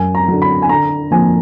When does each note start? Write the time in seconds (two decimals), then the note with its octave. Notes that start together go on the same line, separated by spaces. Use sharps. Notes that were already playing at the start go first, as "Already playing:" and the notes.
Already playing: F#2 G#5
0.15 A#5
0.28 D3 F#3
0.42 B5
0.62 G#5
0.69 D3 A#5
1.11 F3 A#3 G#5